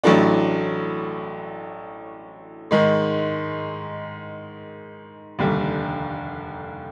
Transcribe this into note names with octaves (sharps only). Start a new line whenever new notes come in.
A1 A2 F#3 A3 D4
G#2 D#3 G#3
F1 D#2 D3 G3